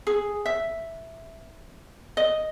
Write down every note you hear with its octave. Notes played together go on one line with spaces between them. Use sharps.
G#4
E5
D#5